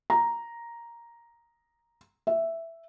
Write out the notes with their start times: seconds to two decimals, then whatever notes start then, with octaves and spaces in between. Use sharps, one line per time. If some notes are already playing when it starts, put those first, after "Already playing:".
0.10 A#5
2.27 E5